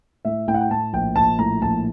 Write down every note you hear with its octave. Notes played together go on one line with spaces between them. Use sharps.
A2 E5
A2 G5
F#5
G5
A2 A5
A#1 G5
A#1 A5
A2 A#5
A#1 A5